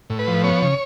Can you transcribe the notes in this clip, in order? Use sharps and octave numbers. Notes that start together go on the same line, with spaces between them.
A2
B4
F3
B3 C#5
C#3